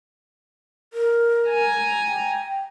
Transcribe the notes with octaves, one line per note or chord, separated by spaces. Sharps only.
A#4
G#5 A#5
G5